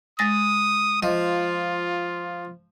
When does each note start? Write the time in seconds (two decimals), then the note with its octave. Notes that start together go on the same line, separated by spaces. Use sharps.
0.19 G#3 D#6 A6 A#6
1.03 F3 F4 D#5